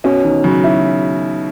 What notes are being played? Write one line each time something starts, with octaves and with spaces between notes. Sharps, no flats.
B2 C#4
D#3
C#3 F#3
E4